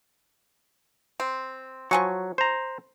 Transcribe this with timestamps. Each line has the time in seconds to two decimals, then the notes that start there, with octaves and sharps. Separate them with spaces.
1.20 C4
1.91 F3 F#3 G#5 C#6
2.38 C5 A#5